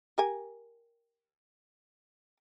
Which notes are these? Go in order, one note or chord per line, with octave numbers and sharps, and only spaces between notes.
G4 A#4 G#5